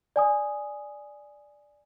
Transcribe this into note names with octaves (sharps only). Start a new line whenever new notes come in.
D5 G#5 D#6